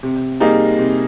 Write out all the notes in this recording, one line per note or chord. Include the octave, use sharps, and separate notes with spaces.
C3
G3 A#3 D#4 G#4
C3